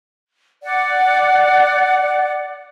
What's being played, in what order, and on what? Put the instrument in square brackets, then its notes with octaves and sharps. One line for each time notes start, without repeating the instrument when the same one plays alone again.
[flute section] D5 F#5